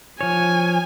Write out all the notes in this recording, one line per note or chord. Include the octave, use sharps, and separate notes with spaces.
F3 C#5 G#5